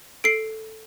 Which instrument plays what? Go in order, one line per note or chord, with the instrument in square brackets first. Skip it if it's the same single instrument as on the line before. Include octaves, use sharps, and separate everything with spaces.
[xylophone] A4 C7 D7